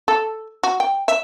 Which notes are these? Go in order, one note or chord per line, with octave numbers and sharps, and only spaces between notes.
A4
F#4
G5
E5